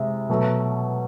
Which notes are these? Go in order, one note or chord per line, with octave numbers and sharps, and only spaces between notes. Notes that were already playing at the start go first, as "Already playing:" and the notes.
Already playing: C3 G#3 E4
B2 F#3 A3